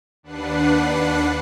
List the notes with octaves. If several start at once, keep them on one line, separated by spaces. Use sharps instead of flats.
D#2 D4 B4 F#5 F#6 C7